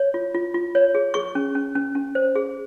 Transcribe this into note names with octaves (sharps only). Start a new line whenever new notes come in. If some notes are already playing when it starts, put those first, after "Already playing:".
Already playing: C#5
F4
F4
F4
C#5
G#4
G#4 C#6
C#4
C#4
C#4
C#4
C5
G#4